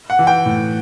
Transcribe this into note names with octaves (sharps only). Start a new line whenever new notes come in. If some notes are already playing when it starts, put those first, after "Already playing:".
F#5
E3
G5
A2